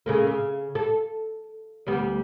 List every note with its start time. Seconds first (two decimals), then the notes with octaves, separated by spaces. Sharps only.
0.06 C#3 A3 A#3
0.27 C#3
0.75 A4
1.86 D2 G3 B3